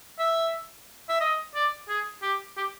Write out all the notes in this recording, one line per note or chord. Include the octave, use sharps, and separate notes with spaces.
E5
E5
D#5
D5
G#4
G4
G4